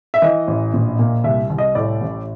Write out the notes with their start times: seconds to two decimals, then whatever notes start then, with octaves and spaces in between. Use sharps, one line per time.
0.14 E5
0.22 E3 D#5
0.47 A1
0.73 A#1
0.99 A#2
1.24 C2 E5
1.50 C2
1.58 D#5
1.75 A2 D5
2.01 A1